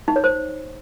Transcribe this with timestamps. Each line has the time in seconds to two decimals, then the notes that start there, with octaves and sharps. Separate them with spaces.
0.08 D#4
0.16 C#5
0.24 C5